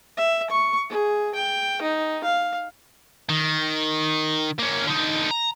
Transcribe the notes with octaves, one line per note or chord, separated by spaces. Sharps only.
E5
C#6
G#4
G5
D#4
F5
D#3
A#3 C#4
D3 D#4
A#5